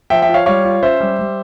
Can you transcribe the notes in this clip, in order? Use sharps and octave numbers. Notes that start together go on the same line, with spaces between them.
F3 E5 G5
E5 G5
F4
C#5 F5
G3 C#5 F5
F4
C#4 C5 E5
G3
G3